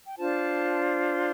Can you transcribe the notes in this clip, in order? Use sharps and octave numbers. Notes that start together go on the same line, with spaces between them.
G5
D4 F4 C5 A5
C6